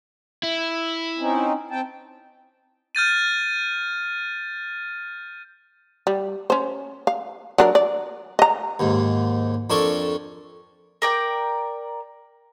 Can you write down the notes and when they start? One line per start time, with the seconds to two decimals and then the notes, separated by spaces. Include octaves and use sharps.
0.43 E4
1.19 C4 C#4 D#4
1.71 C4 G5 A5
2.95 F6 G6 A6 D#7
6.07 G3
6.50 C#4 C5
7.07 F5
7.58 F#3 D4 A#4
7.75 D5
8.39 D#5 A#5
8.79 D#2 G#2
9.70 F2 D4 A4 A#4 C#6
11.02 A#4 D5 G5